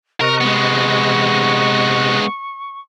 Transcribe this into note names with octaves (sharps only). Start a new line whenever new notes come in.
C3 A#4 D#5 C#6 F#6
G#3 B3